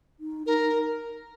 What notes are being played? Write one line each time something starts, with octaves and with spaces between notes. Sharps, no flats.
D#4
D#4 A#4